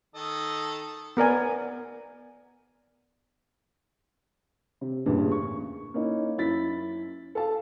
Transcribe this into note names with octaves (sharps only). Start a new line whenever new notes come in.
D#3 A4 D#5
B3 A#4 D5 G#5
C3
A1 E2 G2 A#2 C#3
C#6
A#3 C#4 D#4 E4
F#2 E4 A6 B6
A4 F5 A5